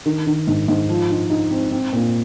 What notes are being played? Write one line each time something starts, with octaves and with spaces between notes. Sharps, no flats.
D#3
D#3
G#2
G#2
F3
D#4
D#4
C4
C4
A#2